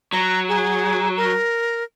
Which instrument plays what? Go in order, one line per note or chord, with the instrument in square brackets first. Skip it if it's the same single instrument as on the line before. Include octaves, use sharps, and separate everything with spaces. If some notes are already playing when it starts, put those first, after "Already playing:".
[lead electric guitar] F#3 [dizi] A#5
[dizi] G#4
A#4